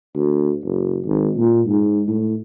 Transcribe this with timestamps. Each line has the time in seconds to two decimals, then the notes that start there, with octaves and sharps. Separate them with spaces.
0.15 D2
0.64 F#1
1.04 G#1
1.37 A#2
1.67 G#2
2.08 A2